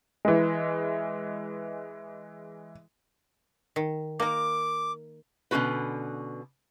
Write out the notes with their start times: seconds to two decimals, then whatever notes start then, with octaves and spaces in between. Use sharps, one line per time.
0.25 E3 G#3
3.76 D#3
4.20 A#3 D#4 A#4 D6
5.51 B2 D3 C#4 F#4 B4